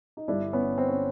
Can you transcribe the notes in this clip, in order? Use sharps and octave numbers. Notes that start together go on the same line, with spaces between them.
D#4
G1 G2 D3 G3 D4 E4
B3 C#4
C4
C#4